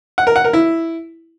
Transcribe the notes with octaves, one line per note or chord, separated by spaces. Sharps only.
F#5
A#4
F#5
A#4
E4